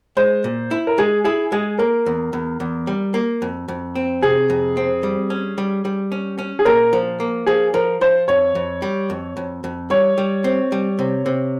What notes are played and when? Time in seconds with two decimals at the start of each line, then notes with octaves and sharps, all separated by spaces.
0.17 G#3 C5
0.44 A#2
0.71 E4
0.87 A#4
0.98 G#3 G#4
1.24 E4 G#4
1.52 G#3 G#4
1.79 A#3 A#4
2.06 E2
2.33 E2
2.60 E2
2.87 G3
3.14 A#3
3.42 F2
3.68 F2
3.95 C4
4.22 C3 G#4
4.50 F2
4.77 C4
5.03 G3
5.30 C#4
5.58 G3
5.85 G3
6.12 C#4
6.39 C#4
6.59 G#4
6.65 A#2 A#4
6.93 F3
7.20 A#3
7.46 F3 G#4
7.74 F3 A#4
8.01 F3 C5
8.28 F2 C#5
8.55 F2
8.82 G3
9.10 F2
9.37 F2
9.64 F2
9.90 G3 C#5
10.18 G3
10.44 C4
10.72 G3
10.99 C3
11.26 C3